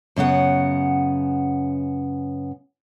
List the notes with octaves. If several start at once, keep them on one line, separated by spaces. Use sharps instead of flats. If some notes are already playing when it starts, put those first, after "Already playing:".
F#2 C#3 B3 F#5